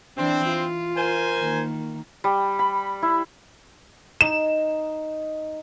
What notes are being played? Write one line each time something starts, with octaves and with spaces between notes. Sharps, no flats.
E3 C4 D4
F4
A#4 C5 G#5
D#3 A#3
G3
B5
E4
D#4 E7